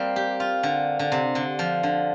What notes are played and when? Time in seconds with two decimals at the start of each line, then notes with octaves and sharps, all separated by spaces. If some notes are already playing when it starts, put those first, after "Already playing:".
Already playing: G3 A#3 C4
0.16 G4
0.40 F4
0.63 D3
0.99 D3
1.12 C3
1.35 D3
1.59 F3
1.83 D3